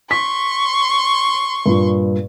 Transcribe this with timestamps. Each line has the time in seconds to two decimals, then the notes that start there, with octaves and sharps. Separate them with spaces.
0.11 C6 C#6 B6
1.66 G2 A#2